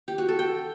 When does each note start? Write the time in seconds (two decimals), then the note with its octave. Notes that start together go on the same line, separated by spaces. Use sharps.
0.08 G4
0.18 F#4
0.29 A4
0.39 G5